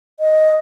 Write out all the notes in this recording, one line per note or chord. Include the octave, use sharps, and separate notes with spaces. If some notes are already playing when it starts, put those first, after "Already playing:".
D#5